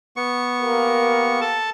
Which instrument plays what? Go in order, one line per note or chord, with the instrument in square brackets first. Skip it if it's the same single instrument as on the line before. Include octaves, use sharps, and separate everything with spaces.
[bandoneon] B3 C#6
[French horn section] A#3 G4 A#4
[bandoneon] A4 A5